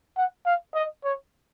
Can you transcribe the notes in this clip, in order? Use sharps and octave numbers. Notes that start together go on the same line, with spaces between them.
F#5
F5
D#5
C#5